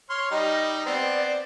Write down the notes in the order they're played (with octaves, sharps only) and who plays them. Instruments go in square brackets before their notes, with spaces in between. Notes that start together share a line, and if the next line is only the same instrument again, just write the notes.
[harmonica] C#5 C6 F6
[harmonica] G3 D#4 [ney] D#5
[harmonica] B3 C4 [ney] D5